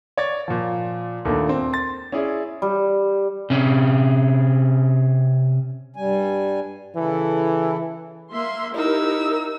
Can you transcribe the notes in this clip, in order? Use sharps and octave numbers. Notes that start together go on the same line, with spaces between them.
C#5 D5 A6
A#2 F3
D#2 A#2 D3 D#3 A3
C4
C6 A6
C#4 E4 G#4 D5
G3
C3 C#4
G2 G3 G#5
C#3 E3 E4 A4
A#3 E5 C6
D#4 E4 G4 A#4 E6